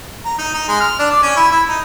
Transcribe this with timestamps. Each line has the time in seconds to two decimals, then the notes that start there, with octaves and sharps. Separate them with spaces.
0.25 A#5
0.38 D#4
0.54 D#4
0.68 G#3
0.80 F6
0.99 D4
1.10 D5
1.22 C#4
1.36 E4
1.51 E4
1.69 D#4